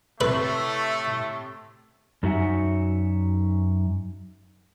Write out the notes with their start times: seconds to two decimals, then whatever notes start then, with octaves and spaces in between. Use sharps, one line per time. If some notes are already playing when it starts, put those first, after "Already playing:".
0.21 A2 C3 A3 B4
2.23 F#2 D#4 F#4 E5 F#5 G#5